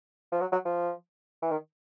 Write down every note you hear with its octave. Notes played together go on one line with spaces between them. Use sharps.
F3
F#3
F#3
F3
E3
D#3